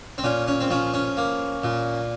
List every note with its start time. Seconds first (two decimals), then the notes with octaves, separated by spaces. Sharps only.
0.18 C4
0.24 A#2 C#4
0.47 C#4
0.60 C4
0.70 F3 C#4
0.94 C#4
1.17 A#3
1.64 A#2